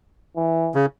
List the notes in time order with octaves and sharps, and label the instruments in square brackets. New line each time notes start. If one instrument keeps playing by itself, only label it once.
[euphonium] E3
[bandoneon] C#3